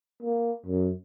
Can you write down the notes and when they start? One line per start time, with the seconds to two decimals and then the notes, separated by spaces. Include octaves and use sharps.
0.23 A#3
0.66 F#2